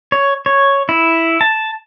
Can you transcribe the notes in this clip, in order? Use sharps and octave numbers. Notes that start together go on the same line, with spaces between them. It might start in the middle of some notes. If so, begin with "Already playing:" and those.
C#5
C#5
E4
A5